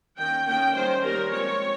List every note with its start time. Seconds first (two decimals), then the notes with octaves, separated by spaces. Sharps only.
0.18 D#3 A#3 C#4 G5
0.47 D#3 A#3 C#4 G5
0.75 D#3 G3 A#3 C#4 C5
1.03 D#3 G3 A#3 C#4 A#4
1.31 F3 G#3 C4 C#5